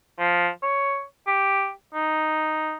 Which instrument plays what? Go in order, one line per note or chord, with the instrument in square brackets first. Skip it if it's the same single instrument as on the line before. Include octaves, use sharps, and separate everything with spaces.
[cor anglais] F3
C#5
G4
D#4